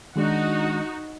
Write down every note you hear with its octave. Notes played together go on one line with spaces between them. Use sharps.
D#3 G#3 D4 D#4 F#4